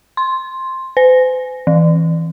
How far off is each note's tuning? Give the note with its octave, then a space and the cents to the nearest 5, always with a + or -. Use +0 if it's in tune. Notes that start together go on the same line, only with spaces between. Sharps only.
C6 +5
C5 -45
E3 -10